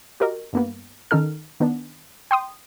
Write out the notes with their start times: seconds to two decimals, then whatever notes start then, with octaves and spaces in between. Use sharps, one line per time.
0.20 F#4 G4 A#4 D#5
0.53 G2 A#3 B3
1.11 D#3 C#4 D#4 A4 F6
1.60 D#3 B3 D4
2.31 G5 C6 D#6